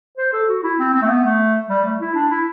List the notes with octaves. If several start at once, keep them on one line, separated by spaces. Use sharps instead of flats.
C5
A4
F#4
E4
C4
C4
A3
B3
A3
G3
A3
E4
D4
E4